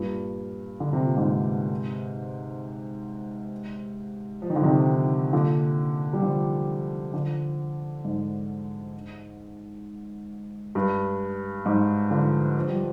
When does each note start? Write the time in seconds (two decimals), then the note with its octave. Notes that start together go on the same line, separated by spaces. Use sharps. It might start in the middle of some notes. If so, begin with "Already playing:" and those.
Already playing: G2 A#2
0.80 D3
0.93 C3
1.04 A#2
1.16 G#2 C3
4.42 F3
4.50 D#3
4.56 D3
4.63 C3 D#3
5.33 A#2 D3
6.13 G3
6.22 D3 F3
7.13 D3 F3
8.04 G#2
10.75 G2
11.66 G#2
12.11 D3 F3
12.57 F3
12.68 G3